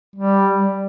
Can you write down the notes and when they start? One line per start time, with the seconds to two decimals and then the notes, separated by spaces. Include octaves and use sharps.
0.16 G3